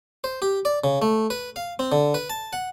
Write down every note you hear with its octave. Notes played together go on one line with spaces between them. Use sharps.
C5
G4
D5
C#3
A3
B4
F5
C4
D3
B4
A5
F#5